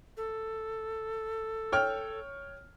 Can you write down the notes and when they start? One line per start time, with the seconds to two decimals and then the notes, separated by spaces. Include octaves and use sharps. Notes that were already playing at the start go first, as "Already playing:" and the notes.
0.17 A4
1.72 C#5 G5 F6